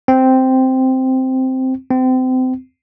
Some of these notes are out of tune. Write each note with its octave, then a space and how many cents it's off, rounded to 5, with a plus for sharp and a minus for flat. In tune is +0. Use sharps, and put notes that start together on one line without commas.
C4 -5
C4 -30